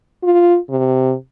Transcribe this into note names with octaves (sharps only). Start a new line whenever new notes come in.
F4
C3